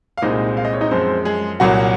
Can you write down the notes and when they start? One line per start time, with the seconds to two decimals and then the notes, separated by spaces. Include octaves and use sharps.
0.17 F5
0.22 C2 A#2 G#3 C4 D#4 D#5
0.57 F5
0.65 D#5
0.73 C#5
0.81 D#4 D#5
0.91 F#2 F3 G#3 C4 C5
1.25 G#3 G#4
1.60 C2 A#2 F#3 A#3 F#4